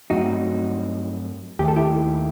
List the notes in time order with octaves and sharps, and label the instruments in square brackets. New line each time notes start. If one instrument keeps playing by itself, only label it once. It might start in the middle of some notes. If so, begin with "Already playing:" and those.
[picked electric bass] G2 F#3 A3 C4 [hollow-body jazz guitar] D#4 F#4
[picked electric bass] D#2 D#3 A3 [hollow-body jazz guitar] G4
[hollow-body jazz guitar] A4
E4 G4